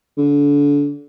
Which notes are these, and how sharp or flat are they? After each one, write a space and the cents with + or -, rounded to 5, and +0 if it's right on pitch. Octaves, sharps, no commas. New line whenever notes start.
D3 -30